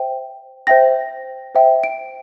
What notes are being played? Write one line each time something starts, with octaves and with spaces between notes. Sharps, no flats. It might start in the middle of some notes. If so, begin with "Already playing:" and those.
Already playing: C5 E5 G5
C5 E5 G5 A#6
C5 E5 G5
D7